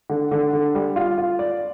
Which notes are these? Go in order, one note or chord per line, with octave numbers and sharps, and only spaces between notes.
D3
D3
D3
G3
F4
F4
D5